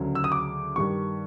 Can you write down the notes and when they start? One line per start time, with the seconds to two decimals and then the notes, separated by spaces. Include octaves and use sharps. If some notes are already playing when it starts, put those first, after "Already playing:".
Already playing: D2 C#3 F#3
0.15 E6
0.24 D#6
0.32 D6
0.76 G2 D#3 G3 C#6